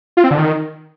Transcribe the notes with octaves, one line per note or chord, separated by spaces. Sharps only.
F4
C4
D3
D#3